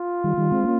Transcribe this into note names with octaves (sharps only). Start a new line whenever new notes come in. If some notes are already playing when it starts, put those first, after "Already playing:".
Already playing: F4
D#3 G3
D#3 G3
G#3 C4
A#3 C#4